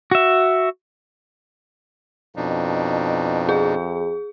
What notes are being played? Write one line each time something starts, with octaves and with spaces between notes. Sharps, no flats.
F#4 E5
F2 B2 D4 D#4
G#4